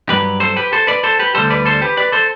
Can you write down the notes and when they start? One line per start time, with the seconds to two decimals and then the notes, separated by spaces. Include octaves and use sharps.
0.09 G2 F#3 G4 B4
0.40 A4 C5
0.56 G4 B4
0.73 A4 C5
0.87 B4 D5
1.04 A4 C5
1.19 G4 B4
1.35 D2 D3 G3 A4 C5
1.50 B4 D5
1.66 A4 C5
1.82 G4 B4
1.97 B4 D5
2.12 A4 C5